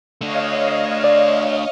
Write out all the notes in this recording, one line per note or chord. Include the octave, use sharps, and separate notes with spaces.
A3 D4 C#5 D#5 F5
D5